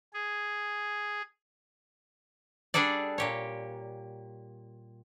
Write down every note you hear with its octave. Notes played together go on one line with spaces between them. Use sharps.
G#4
G3 D4 G#4 A4 D5
A#2 G4 C#5